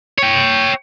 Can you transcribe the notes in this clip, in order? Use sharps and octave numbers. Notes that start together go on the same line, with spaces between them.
C#5 G5